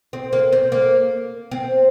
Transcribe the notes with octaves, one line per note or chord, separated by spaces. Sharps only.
C4
A#3
C4
A#3
C4